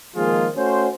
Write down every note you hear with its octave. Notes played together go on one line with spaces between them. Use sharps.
D#3 F3 G#3 A#3 F4 G#4
A3 C#4 F#4 C5